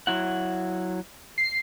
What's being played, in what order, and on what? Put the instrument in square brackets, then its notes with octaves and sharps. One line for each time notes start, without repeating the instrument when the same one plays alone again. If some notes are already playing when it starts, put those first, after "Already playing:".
[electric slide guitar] F#3 E4 F#5
[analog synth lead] C7